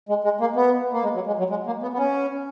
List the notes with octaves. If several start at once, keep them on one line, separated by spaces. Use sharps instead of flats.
G#3
G#3
A#3
B3
A#3
G#3
F#3
G#3
F#3
G#3
A#3
B3
B3
C#4